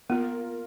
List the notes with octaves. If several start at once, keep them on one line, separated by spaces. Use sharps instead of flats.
A#3 B3 F4 A#4